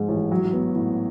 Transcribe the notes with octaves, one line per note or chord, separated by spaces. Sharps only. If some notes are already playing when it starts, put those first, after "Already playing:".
Already playing: G#2 F3 G#3
A1
F#3
B3
A2